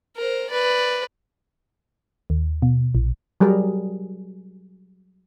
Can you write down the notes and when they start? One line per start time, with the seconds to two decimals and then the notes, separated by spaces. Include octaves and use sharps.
0.17 A#4 C5
0.50 B4 D5
2.30 D#2
2.62 B2
2.95 A#1
3.40 F#3 G3 G#4 A#4